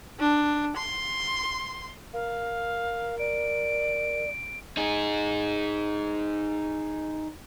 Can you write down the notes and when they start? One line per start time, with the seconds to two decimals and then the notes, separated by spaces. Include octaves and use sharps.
0.20 D4
0.76 C6
2.13 A#4 F5
3.19 D5 D7
4.77 D#4 G#4